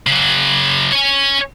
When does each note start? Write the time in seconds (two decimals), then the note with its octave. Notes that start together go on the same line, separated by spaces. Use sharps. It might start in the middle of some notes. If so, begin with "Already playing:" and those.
0.07 C#3 F#3
0.92 C#5 G#5